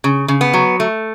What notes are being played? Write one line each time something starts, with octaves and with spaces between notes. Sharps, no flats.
C#3
C#3
B3
F#3
A3